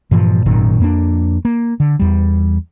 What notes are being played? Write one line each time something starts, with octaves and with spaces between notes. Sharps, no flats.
G2 A#2 E3 F3
G#1 F#2 A#2 D#3
F2 A#3 B3 D4
A#3
D3
E2 G3